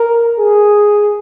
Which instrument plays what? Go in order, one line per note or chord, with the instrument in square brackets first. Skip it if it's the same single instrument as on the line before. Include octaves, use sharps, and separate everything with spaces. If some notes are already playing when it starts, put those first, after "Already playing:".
Already playing: [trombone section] A#4
G#4